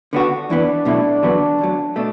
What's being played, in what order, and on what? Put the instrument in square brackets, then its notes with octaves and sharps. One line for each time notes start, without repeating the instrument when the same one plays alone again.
[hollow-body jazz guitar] D3 B3 D4 F#4
[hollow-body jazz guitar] E2 E3 B3 [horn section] D4
[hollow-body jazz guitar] B1 B2 A3 E4
E2 D3 F#3 B3
D2 D3 F#3
B2 A3 D4